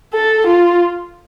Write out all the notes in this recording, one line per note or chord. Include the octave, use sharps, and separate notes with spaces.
A4
F4